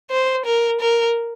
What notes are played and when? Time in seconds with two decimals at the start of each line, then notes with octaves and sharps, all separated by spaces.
0.11 C5
0.46 A#4
0.81 A#4